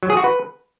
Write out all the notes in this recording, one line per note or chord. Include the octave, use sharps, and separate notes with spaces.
F#3
G#4
F#4
B4